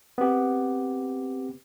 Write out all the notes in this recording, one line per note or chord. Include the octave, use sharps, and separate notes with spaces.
B3 C4 G4